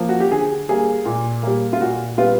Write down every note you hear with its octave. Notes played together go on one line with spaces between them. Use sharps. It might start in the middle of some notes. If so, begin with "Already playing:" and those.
Already playing: F3 A#3
F#4
G4
D3 G#4
G3 A#3 G#4
A#2
G3 A#3
F4
A#2 F#4
G3 B3 F4